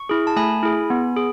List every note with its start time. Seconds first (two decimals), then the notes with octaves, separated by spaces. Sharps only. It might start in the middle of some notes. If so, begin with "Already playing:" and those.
Already playing: C#6
0.09 E4 G#4
0.27 A5
0.36 A3 G#5 B5
0.63 E4 G#4
0.90 B3
1.17 G#4